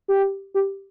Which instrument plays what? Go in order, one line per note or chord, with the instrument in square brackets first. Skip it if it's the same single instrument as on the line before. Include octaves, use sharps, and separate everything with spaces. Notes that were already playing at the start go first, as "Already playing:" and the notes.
[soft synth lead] G4
G4